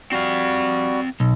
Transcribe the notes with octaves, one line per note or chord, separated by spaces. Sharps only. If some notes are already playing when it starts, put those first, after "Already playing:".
G3 C4 F#4 F5
B1